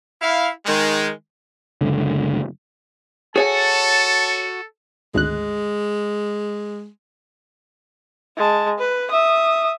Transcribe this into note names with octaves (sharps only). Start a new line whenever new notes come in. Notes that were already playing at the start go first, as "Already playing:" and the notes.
E4 F5
D#3 G#3
F#1 C#2 D3
F#4 G#4 A4 C#5 G#5 A5
G#1 D2 G#3 F#6
G#3 A5
B4
E5 D#6